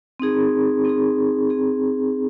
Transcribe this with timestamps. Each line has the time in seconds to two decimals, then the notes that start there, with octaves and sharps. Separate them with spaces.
0.20 C4 D#4 G#4
0.85 C4 D#4 G#4
1.50 C4 D#4 G#4